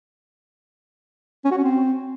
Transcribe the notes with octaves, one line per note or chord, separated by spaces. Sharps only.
C#4
F#4
C#4
C4